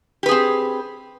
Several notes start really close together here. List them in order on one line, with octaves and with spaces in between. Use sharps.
G4 B4 G#4 C4